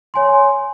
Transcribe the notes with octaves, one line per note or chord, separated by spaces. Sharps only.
C#5 G#5 C6